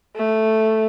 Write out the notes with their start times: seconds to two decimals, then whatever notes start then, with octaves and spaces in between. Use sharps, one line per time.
0.16 A3